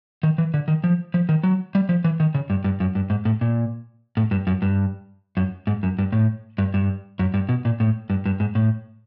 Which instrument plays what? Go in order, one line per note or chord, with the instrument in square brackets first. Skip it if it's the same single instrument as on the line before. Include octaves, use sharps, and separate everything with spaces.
[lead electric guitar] D#3
E3
D3
D#3
F3
F3
D#3
F#3
G3
F3
E3
D#3
C#3
G2
G2
F#2
G2
G#2
A2
A#2
A2
G2
F#2
G2
F#2
G#2
F#2
G2
A2
G2
G2
F#2
G2
B2
A#2
A2
G2
G2
G#2
A2